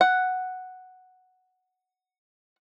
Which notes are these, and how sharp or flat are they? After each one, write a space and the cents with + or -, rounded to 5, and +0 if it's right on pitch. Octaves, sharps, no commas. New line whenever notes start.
F#5 +0